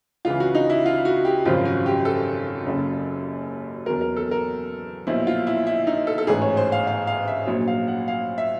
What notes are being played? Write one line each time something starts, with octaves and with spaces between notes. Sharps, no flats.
C#2 C#3 E3 F4
F#4
D#4
E4
F4
F#4
G4
G#1 F#2 C#3 F3 F4
F#4
G4
A4
F#1 F#2 C#3
E2 B2 F#3 A#4
A#4
A4
A#4
B1 A#2 F3 E4
F4
E4
E4
D#4
A4
A4
A1 G#2 E3 G#4
C#5
C5
F5
F5
F5
E5
A#1 A#2 F#3
F5
F#5
F5
E5